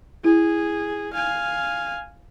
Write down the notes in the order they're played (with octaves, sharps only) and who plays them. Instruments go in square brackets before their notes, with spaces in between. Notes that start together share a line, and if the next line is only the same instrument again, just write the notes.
[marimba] E4 [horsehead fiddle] G#4
[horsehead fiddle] F5 G#5